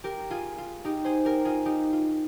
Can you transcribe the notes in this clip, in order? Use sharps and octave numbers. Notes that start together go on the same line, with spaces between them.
G4 A#4
F4 G#4
F4
D#4 G4
G#4 C5
G4 A#4
F4 G#4
D#4 G4
F4